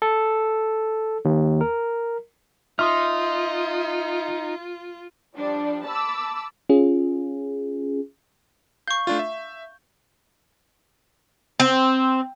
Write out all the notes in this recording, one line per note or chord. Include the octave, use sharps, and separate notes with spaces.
A4
D#2
A#4
D#4 F4 E5 C6 D#6 F6
F3 G3 D4
A5 B5 D6 E6
C#4 F4 G#4
F5 C#6 G6
A3 D4 F4
E5
C4